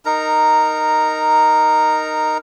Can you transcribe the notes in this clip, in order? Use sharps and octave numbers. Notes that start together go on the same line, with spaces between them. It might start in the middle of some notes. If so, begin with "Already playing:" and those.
D#4 A#4 A#5